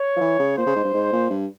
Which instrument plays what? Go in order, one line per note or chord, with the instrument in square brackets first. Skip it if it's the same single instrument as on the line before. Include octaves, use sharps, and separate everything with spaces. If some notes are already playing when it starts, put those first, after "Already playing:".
Already playing: [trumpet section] C#5
[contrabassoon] F3
E3
C#3
[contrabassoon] A#2 [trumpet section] C5
[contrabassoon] C#3
G#2
G2
G#2
A#2
G2